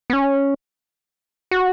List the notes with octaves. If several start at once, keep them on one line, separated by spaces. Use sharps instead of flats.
B3
C#4
F#4